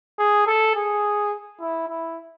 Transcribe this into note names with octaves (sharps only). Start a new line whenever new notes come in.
G#4
A4
G#4
E4
E4